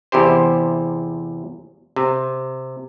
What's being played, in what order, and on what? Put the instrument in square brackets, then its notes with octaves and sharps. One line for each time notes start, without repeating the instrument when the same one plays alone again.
[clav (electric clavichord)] E2 C3 E4 G4 C5
C3